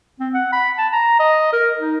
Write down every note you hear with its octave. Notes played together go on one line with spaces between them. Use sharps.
C4
F#5
B5
A5
A#5
D#5
A#4
D#4